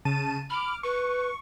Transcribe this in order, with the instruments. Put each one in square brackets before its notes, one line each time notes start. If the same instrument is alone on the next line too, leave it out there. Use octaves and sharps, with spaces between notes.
[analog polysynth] C#3 A5 D#7
[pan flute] B5 [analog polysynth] D6 F6
[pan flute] B4 [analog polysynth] C#6